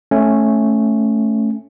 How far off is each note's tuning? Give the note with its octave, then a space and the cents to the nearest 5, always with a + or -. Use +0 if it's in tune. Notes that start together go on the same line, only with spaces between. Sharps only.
A3 +0 C#4 -5